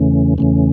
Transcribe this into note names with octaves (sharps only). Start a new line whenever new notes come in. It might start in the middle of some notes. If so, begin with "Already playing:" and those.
Already playing: E2 C#3 E3 A3 C#4
E2 C#3 E3 A3 C#4